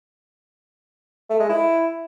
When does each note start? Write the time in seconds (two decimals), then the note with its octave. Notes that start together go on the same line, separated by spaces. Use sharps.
1.30 A3
1.40 G#3
1.49 E4